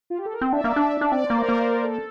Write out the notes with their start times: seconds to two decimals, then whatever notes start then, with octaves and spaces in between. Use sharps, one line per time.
0.10 F4
0.18 G4
0.25 A4
0.33 A#4
0.41 C4 C5
0.53 D4 E5
0.58 D5
0.64 A#3
0.76 D4 E5
1.01 D4
1.12 C4 D5
1.26 A#3 C5
1.38 A#4
1.49 A#3 C5
1.84 A4